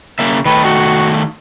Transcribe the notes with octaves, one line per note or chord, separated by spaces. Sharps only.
C#3 A#3 E5
D#3 A3 B4
F#4